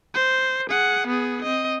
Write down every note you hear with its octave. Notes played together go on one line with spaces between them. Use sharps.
C5
G#4 F#5
B3 G#4
C4 D#5